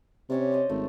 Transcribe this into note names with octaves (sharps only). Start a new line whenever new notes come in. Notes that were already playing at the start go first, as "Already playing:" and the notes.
C3 C#4 C#5 D5
C5 D#5
G#1 A3